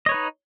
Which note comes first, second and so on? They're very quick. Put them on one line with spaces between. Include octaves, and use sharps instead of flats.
D#5 C#5 B4 D#4